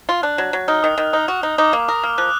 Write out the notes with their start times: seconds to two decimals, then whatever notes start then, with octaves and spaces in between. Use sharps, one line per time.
0.09 F4
0.23 D4 F#6
0.38 F#3
0.53 F#3
0.68 D#4 F6
0.83 D#3 D#6
0.98 D#3 D#6
1.13 D#4 D#6
1.28 F#4
1.43 D#4
1.58 D#4 D6
1.73 A#3 D6
1.88 A#4 D#6
2.03 A#3 F6
2.18 F3 F#6